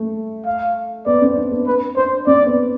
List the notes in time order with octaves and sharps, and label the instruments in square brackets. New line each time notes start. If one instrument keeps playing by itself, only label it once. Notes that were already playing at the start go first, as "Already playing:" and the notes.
Already playing: [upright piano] A3
[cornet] F5
[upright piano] B3 [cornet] D5
[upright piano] C4
D4
B3
[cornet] B4
[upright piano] D4 [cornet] C5
[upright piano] C4 [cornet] D5
[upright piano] B3